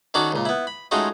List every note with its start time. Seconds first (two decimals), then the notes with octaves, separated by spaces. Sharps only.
0.14 D#3 C#4 D#4 F#4 A4 D5
0.32 C#2 A#2
0.45 B3 E4
0.67 B5
0.91 G#3 A3 C#4 D#4 F4 F#4